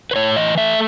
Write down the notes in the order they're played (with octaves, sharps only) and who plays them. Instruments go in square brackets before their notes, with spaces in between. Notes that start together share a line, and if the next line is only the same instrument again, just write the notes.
[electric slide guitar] B4
A2 C#5
E3 D#5
A3 E5